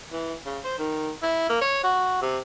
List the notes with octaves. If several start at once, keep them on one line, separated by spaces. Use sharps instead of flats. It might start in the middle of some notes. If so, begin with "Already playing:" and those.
E3
C#3
C5
D#3
E4
A#3
C#5
F#4
C3